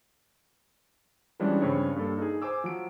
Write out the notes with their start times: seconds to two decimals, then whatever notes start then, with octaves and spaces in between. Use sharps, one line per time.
1.39 E3 F3 G3 G#3 C#4 D4
1.62 G2 C#3 C4 C#5
1.96 G2 A#3 A4
2.18 D#4 G#4
2.42 C5 G#5 D6 E6
2.64 F3 F#3 D7